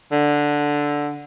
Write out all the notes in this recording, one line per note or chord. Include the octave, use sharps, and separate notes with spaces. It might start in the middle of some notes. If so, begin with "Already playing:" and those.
D3